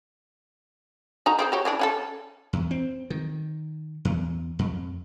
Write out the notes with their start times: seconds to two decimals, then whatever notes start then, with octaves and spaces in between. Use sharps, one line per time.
1.26 D#4 F#4 A#5
1.39 C4 G#4 C5
1.52 F#4 G4 C#5
1.65 C#3 E3 D4
1.79 C#4 F#4 A4
2.53 E2
2.71 C4
3.10 D#3
4.05 E2
4.59 F2